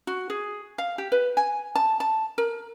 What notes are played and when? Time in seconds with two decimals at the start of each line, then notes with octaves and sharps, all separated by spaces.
0.07 F#4
0.30 G#4
0.78 F5
0.98 G4
1.12 B4
1.37 G#5
1.75 A5
2.00 A5
2.38 A#4